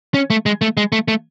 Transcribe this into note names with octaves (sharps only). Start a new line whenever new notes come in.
C#4
A3
G#3
A3
G#3
A3
A3